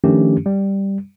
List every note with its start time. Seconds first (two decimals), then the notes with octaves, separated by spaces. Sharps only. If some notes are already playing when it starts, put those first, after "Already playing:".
0.04 D#3 F3 A3 C#4 D4 G4
0.46 G3